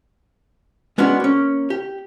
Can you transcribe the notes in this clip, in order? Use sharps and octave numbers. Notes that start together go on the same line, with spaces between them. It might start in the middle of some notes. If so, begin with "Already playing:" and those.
G#3 B3 C#4 D4 F#4
A#3 C#4
G4